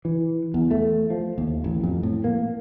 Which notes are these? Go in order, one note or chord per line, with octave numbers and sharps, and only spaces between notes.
E3
E2
A3
F3
D#2
A1
F2
A2
A#3